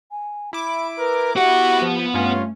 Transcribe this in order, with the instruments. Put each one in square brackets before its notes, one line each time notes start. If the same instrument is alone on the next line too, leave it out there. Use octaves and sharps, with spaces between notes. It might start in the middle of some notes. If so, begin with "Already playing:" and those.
[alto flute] G#5
[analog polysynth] E4 D6 [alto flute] B5
[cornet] A#4 [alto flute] B4
[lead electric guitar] B3 F#5 [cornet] F#4 [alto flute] G4
[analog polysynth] F3
[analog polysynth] G2 C#4 [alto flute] A3 [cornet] F4